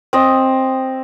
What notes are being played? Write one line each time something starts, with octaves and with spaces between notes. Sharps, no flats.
C4 D#5